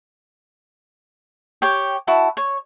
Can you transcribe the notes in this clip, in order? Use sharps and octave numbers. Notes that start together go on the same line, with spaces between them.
G4 C#5 G5
E4 F#4 A5
C#5